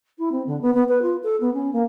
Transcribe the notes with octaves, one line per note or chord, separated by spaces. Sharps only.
E4
C4
D3
B3
B3
B4
F4
A4
B3
C#4
A#3